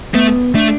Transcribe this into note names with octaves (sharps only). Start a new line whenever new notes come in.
A3 B3
A3 D4